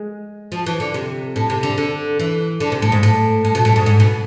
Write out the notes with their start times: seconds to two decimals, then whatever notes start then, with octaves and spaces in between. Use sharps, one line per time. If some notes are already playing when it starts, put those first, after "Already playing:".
Already playing: G#3
0.52 F3
0.66 E3
0.80 D3
0.94 C3
1.36 A2
1.50 C3
1.63 D3
1.78 D3
2.19 E3
2.60 D3
2.72 C3
2.82 A2
2.92 G#2
3.03 A2
3.45 A2
3.55 B2
3.65 A2
3.76 G#2
3.86 G#2
4.00 B2